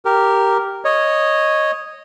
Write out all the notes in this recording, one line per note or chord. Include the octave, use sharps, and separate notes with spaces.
G4 A#4
C#5 D#5